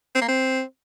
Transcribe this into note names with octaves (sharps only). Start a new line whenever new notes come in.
C4
A#3
C4